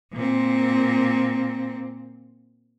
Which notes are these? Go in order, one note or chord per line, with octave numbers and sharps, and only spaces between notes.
A#2 C4